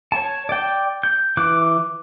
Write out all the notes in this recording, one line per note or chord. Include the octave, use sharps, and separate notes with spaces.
C#5 A5
D5 G5
G6
E3 D6 F#6